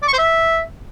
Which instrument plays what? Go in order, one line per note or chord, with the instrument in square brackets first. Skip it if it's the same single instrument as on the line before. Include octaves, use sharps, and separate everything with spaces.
[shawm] D5
C#6
C5
E5